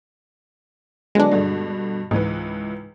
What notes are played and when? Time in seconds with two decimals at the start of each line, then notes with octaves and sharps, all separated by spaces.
1.15 D3 F#3 G#3 B3 D4
1.32 G2 B2 D3
2.11 C#2 G#2 E3 B4